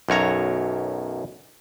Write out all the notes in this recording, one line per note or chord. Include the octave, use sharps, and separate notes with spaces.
B1 F#2 C#5 A#5